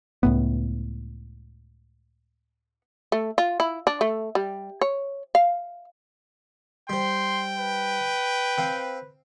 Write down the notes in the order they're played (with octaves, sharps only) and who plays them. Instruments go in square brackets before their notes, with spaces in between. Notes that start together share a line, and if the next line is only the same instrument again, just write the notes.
[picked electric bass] C#2 A2 B3
[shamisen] A3
F4
E4
D4
A3
G3
C#5
F5
[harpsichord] G3 C5 [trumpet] G5 [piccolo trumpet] C6
[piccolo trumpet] B4
[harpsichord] C4 C5 F5